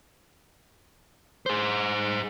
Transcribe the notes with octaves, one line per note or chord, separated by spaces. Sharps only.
G#4 C5